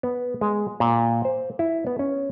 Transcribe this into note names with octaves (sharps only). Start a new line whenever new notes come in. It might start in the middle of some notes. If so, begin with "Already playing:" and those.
B3
G#3
A#2
C5
E4
B3
C#4